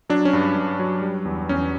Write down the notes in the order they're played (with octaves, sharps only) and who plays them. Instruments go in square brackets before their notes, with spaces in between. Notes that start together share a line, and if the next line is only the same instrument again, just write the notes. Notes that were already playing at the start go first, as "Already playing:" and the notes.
[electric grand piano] F#3 D4
C#4
G2
G2
F#3
G3
E2
E2 C#4